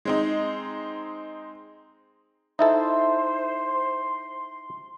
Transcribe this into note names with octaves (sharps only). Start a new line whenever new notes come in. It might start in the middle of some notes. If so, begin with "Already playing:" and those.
G#3 C4 D#4
D#4 E4 A4 C5 E5 C6